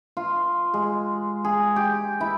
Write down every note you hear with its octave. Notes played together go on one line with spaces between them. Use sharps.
F4
G#3
G#4
G4
E4